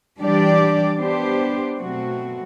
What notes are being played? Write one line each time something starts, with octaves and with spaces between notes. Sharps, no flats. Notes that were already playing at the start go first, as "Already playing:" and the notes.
E3 G3 D4 G4 D5
B3 D4 G4 C5
B2 F#3 A3 C4 F#4